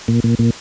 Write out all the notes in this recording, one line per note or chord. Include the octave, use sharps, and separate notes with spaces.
A#2
A#2
A#2